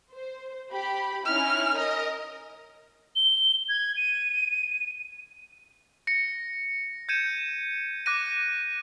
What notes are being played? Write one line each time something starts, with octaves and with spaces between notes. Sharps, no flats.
C5
G4 B5
C#4 D#4 E4 F6
A#4 D#5
G7
G#6
D#7
A#6 C#7
G6 G#6 C#7 D#7 E7
D6 F#6 A#6 D#7